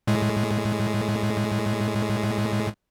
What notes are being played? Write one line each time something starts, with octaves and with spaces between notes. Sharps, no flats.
A2 G#3